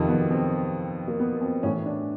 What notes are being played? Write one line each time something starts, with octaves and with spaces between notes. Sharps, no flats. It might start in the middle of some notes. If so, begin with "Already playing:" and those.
Already playing: F2 C3 D#3
B3
C4
A#3
B3
C4
A2 E3 C#4
D4